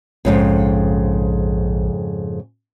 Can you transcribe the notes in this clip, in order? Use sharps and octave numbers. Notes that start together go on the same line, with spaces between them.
A#1 F2 G#2 C#3